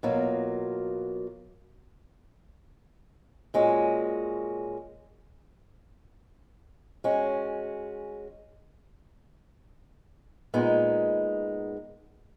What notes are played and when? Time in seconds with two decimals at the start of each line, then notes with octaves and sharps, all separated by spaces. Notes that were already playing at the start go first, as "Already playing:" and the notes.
0.03 B2 F#3 A#3 F4
3.54 A#2 G#3 C#4 F#4
7.04 G#3 C#4 F#4
10.54 A#2 G#3 B3 D#4